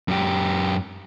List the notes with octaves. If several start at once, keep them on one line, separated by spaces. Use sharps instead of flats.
F#2 G4